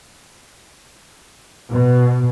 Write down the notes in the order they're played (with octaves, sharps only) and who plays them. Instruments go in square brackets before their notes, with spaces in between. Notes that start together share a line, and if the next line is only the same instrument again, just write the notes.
[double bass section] B2